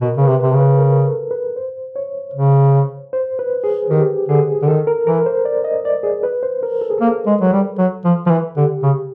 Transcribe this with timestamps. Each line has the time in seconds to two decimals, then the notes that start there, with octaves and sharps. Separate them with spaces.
0.01 B2 A#4
0.17 C#3 B4
0.28 C3
0.41 C3 B4
0.53 C#3
0.60 B4
0.79 A#4
1.05 A4
1.31 B4
1.56 C5
1.96 C#5
2.34 C#3
3.13 C5
3.39 B4
3.64 G#4
3.90 D#3 G4
4.29 D3 G#4
4.62 D3
4.68 D#3 A4
4.87 A#4
5.07 E3 A#4
5.26 C5
5.45 D5
5.64 D#5
5.85 D5
6.03 G#4
6.23 B4
6.43 C5
6.63 A#4
6.81 A4
6.90 G#4
6.98 A#3 A4
7.27 G#3
7.41 F#3
7.53 G3
7.79 F#3
8.05 F3
8.26 F3
8.30 E3
8.57 D3 G4
8.83 C#3